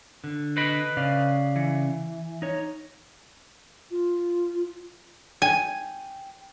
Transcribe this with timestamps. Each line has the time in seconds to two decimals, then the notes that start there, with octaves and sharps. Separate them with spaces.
0.24 D3
0.57 B4 D#5 B5
0.97 C#3 D5 F5
1.56 E3
2.42 D#4 C#5
3.91 F4
5.42 G5 G#5